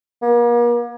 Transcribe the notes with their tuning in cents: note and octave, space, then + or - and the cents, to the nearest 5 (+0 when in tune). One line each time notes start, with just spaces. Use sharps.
A#3 +40